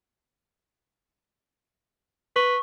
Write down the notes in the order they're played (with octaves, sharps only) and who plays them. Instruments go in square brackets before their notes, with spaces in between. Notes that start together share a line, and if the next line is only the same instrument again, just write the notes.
[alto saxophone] B4 [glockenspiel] C#6